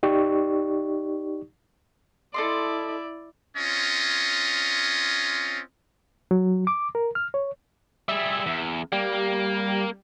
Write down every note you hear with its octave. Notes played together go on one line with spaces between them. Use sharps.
D#4 G4 D5 C#6
E4 A4 D5 D#5 C6
C4 C#4 F4 C#5 D#5
F#3
D6
A#4
F6
C#5
G3 G#4 E5
E2
G3 A#3